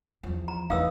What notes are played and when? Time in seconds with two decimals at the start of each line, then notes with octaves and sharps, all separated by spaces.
0.23 E2 F3
0.48 A#5
0.70 E2 E3 D#4 B4 F5 D#6 E6